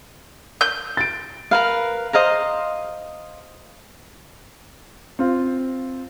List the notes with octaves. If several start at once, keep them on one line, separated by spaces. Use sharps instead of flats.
G6
A6 D7
A#4 B4 F5
C5 D#5 F5 A#5
C4 F4